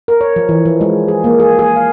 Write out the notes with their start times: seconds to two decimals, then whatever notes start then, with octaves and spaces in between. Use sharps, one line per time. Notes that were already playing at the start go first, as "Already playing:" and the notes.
0.08 A#4
0.21 C#5
0.36 F3
0.49 E3
0.66 F3
0.81 G#3
1.08 G#4
1.24 A#3
1.40 G#4
1.59 G#4
1.76 F5